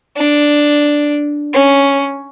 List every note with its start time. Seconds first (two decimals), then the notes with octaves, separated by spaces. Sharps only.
0.16 D4
1.53 C#4